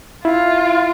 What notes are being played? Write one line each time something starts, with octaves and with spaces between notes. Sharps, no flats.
E4 F4